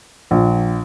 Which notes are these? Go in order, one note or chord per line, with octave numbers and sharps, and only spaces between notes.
A#1